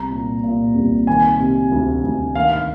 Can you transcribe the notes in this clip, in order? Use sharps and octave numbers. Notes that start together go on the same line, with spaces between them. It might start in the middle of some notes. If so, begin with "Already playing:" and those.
Already playing: C2 A#5
A#2
A#2
C2
D#3 G#5
C3
D2
D2
D#3 F5
F5